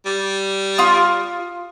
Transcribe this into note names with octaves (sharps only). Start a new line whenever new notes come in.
G3
F4 D#6